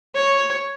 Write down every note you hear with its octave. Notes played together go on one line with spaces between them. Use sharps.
C#5